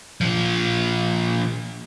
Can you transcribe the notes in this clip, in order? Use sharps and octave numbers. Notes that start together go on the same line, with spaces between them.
A#2 F3